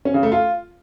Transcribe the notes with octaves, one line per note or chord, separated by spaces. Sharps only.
C#4
C#3
A3
F4